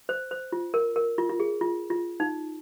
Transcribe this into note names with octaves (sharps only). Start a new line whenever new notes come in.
C5
C5
F4
A#4
A#4
F4
F4
G#4
F4
F4
D#4